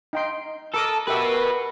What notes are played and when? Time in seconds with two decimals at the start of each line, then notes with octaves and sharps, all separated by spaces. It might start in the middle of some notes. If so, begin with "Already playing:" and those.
0.13 D#4 G5 C6
0.74 A4 A#4 D6 D#6
1.08 F#4 G4 A#4 B4 E5